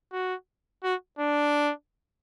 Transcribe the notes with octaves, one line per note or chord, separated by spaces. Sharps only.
F#4
F#4
D4